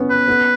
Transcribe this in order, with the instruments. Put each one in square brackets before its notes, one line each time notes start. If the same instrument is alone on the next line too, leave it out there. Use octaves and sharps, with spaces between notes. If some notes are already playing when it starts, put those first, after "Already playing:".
Already playing: [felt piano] B3 C#4
[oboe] B4
[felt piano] B3